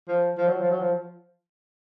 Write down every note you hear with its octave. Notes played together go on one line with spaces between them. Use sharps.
F3
F3
F#3
F3
F#3
F3